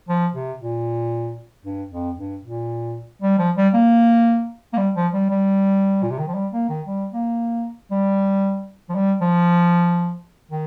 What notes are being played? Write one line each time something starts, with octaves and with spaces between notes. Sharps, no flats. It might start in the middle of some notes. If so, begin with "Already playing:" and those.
F3
C3
A#2
G2
F2
G2
A#2
G3
F3
G3
A#3
A#3
G3
F3
G3
G3
A#2
C3
D#3
F3
G3
A#3
D#3
G3
A#3
G3
F3
G3
F3
D#3